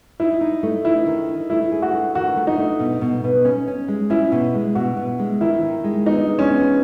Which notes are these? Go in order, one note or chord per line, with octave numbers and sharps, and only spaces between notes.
D#4 E4
D#4
A3
D#4 E4
D#3
D#4
A3 E4
G#4
F#4
A3
D#3 F#4
A3
D#4
A3
B2
B2
B2
C#4
C#4
G#3
C#4 E4
B2
G#3
B2 F#4
B2
G#3
D#3 E4
D#3
G#3
B3 D#4
G#3
C#4
B3